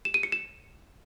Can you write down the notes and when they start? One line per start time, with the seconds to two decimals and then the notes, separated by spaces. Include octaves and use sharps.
0.05 E7
0.14 D#7
0.23 C#7
0.32 E7